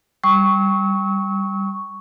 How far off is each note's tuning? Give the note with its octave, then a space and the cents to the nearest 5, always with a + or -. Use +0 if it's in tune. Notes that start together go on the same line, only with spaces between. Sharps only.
G3 +0 C#6 +0 E6 -40